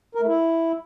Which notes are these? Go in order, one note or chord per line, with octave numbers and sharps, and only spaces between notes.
A#4
A3
E4